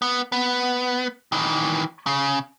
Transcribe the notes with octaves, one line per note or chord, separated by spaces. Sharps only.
B3
B3
D#3 E3
C#3